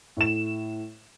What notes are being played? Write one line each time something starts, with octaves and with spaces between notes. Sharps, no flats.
A2 E7